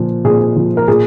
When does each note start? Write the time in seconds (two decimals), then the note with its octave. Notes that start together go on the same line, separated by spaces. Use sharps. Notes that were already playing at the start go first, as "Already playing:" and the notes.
Already playing: A#2 F3
0.24 A#2 G#4
0.56 F3
0.77 A#4
0.88 A#2 G#4